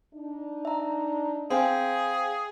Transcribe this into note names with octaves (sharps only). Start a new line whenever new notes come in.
D4 D#4
E5 A#5
C4 G#4 F5 G5 G#5